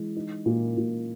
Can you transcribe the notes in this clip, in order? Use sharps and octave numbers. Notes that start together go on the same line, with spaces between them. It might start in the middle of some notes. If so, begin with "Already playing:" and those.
Already playing: E3 G#3
D#4
A#2
A#2